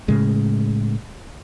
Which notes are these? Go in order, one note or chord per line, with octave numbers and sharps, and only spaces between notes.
A2 C#3 G#3